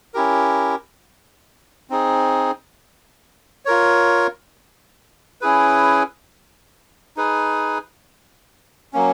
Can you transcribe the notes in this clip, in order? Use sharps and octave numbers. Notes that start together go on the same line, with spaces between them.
C#4 E4 G4 A#4
C4 D#4 G#4
F4 A#4 C#5
C#4 E4 G#4 B4
D#4 G#4 B4
F#3 A#3 C#4